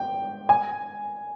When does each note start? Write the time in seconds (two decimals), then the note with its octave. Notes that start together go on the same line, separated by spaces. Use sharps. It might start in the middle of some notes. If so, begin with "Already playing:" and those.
Already playing: G5
0.49 G#5